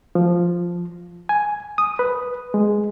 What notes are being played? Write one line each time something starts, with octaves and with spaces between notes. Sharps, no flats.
F3
G#5
D#6
B4
G#3